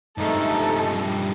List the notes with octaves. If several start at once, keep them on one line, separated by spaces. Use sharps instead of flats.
G2 C3 F3 G#3 A3 D#4 A4
G3